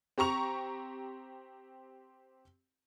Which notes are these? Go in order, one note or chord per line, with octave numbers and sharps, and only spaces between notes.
C4 G4 A#5 C#6 F7